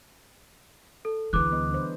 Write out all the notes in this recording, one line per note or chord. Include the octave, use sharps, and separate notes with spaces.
A4
D2 D3 E3 G#4 B4 D6 F#6
G3 B3 D#5
D4 C5